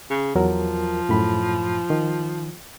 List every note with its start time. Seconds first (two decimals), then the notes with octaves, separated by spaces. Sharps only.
0.10 C#3
0.35 E2 F3 F#3 A#4
1.09 F#2 A2 B5
1.90 D#3